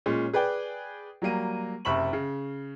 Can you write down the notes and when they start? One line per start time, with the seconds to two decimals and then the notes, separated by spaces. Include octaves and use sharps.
0.06 A#2 G#3 C#4
0.33 G#4 B4 D5 G5
1.22 F#3 G3 A#3 D#7
1.85 F#1 C3 E5 B5 C#6 F#7
2.13 C#3